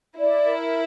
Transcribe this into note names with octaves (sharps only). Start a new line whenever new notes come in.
E4 D5
A#4